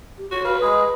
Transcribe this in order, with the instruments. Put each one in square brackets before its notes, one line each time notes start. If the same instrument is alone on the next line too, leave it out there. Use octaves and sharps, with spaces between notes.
[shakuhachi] G4
[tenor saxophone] F#4 [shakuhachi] C#5
[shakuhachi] F#4 [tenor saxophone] B4 [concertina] F5
[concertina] G#3 G#4 [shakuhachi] D#5